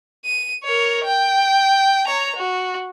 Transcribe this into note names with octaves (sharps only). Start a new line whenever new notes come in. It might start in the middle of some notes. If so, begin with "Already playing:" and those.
D#7
A#4 C#5
G5
C#5 A#5
F#4